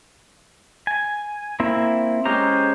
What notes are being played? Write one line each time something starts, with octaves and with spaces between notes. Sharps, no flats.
G#5
A#3 C4 E4
G#3 C#4 G4 C5 A#5